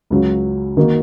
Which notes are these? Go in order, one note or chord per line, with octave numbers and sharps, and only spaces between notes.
C#2 C#3 F#3
D#3 A#3 D#4 F#4